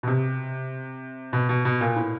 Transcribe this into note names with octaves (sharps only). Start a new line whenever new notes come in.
B2
C3
B2
B2
B2
A#2
A2